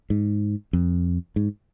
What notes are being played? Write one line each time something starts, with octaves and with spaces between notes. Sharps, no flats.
G#2
F2
G#2